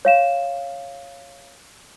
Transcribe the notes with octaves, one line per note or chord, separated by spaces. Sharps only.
C#5 F5 E7